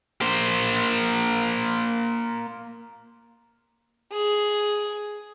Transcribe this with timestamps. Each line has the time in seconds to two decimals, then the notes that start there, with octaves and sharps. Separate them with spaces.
0.21 A#3 C5
4.12 G#4